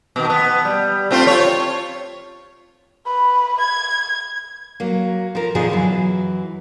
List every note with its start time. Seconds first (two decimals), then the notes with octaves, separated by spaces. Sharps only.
0.16 B2 D#3
0.30 B3
0.65 G3
1.11 A3 C4 F4
1.27 F4 C#5
3.06 B4
3.61 G#6
4.80 F#3 A#3
5.35 F3 A#4
5.55 B2 D3 F3 F4 G#4
5.69 F#2 E3 F#3